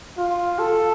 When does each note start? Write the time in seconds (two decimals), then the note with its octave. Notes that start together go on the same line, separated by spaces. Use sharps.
0.18 F4
0.59 A4